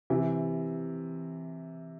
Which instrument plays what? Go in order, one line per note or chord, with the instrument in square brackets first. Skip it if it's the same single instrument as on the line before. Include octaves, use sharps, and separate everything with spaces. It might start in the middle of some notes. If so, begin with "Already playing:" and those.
[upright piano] C3 E3